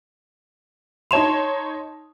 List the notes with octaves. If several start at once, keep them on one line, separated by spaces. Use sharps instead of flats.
D#4 C#5 A5 C6 E7 F7